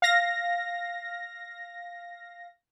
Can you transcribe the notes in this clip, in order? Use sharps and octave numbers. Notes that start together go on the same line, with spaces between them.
F5 A#6